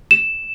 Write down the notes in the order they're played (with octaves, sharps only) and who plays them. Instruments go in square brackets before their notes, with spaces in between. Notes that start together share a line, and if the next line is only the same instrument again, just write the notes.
[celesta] E7